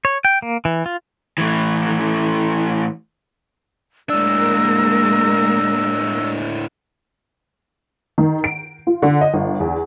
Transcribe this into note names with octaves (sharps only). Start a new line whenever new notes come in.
C#5
G5
A#3
E3
F4
A2 E3
A2 G#3 A#3 D4 A#4 E6
D#3
D7
F4
D3
D#5
G1
E2